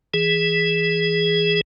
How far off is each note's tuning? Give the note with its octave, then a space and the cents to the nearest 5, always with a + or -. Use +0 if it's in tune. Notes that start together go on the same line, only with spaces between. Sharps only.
E3 +0 G#4 +0